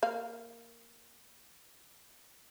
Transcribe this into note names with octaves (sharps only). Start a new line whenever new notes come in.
A#3 F5